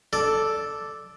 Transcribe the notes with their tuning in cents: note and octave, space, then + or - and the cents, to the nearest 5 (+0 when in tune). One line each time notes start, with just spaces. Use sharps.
A4 +0 D5 +0